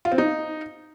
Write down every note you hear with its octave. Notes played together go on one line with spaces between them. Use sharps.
F4
C4
D#4